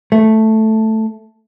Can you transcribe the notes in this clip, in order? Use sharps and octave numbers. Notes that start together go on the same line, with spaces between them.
A3